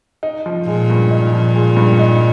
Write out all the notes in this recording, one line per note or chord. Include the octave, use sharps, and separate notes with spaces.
D#4
F3
A#2 G#3
G2
D#4
F3
G#3
G2
D#4